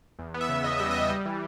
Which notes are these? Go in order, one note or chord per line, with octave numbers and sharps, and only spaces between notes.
E2
B3
E5
C#3
E2 D#5
G3 E5
E2 D#5
G3
E3